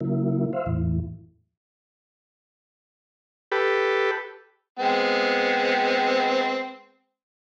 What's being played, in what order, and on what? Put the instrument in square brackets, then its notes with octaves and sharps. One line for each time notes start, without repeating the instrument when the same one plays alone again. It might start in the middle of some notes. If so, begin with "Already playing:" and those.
[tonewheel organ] C#3 F#3 A#3 E4
C5 E5 F5
E2 A2 E3
[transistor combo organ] G4 A4 B4
[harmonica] G#3 B3 C4